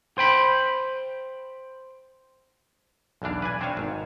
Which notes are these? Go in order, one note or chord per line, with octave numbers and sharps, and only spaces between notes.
C5 G5 B5
B1 E2 E3 D4 F5
B4 D5 G#5
C4 D4 C5 C#5 F5
G#1 G#2